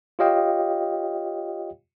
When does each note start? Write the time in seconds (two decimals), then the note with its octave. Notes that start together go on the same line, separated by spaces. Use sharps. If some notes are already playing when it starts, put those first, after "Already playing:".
0.19 F4 G4 C#5 D#5 F5 G5